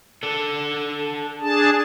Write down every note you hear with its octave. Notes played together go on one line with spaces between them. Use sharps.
D4 A4
D4 G#4 A5